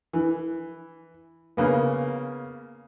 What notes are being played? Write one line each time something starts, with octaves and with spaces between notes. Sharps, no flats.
E3
C#3 A#3 B3